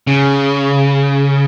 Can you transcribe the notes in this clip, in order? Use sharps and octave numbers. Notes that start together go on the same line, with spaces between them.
C#3